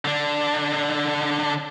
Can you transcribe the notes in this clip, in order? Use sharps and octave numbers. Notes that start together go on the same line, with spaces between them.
D3 D4